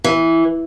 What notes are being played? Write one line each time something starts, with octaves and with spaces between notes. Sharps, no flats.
E3